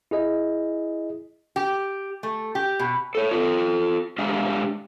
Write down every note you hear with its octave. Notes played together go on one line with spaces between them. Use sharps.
E4 G#4 D#5
G4
A3
G4
B2
A4 C#5
F4 A4
G#3 D4 G4 E5 F5